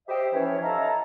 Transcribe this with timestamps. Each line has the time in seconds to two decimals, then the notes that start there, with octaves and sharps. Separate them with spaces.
0.08 G4 C5 D#5 E5
0.33 E3 F3 C#4 C#5
0.62 D#4 E4 A4 F5 A5 A#5